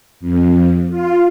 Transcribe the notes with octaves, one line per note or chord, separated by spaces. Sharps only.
F2
F4